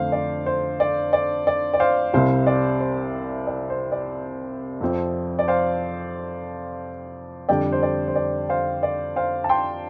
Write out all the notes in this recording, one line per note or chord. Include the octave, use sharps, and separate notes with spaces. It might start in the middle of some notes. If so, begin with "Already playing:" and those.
Already playing: F2 D3 A3 D4 C5 F5
D5
C5
D5
D5
D5
D5
C5 F5
C2 C3 G3 C4 C5 F5
D5
C5
D5
C5
D5
F2 F3 C4
D5
C5 F5
F2 D3 G3 D4 D5 G5
C5
D5
C5
D5
C5 F5
D5
C5 F5
A5
G5 C6